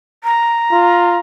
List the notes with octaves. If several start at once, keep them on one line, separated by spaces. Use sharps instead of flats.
A#5
F4